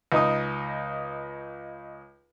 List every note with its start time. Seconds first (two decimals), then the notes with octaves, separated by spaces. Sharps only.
0.12 C#2 D#4 D#5